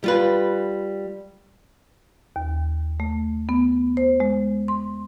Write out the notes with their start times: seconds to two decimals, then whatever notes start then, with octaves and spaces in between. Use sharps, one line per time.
0.04 G3 F4 B4
2.36 D#2
3.00 A3
3.49 B3
3.97 C5
4.20 G#3
4.68 C6